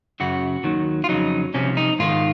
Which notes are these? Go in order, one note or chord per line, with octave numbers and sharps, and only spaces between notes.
F#2 C#3 F#3 F#4
D#2 D#3 F#3
F4
F2 C#3 F#3 D#4
C2 C3 F3 C#4
D#4
G#2 D#3 G#3 F4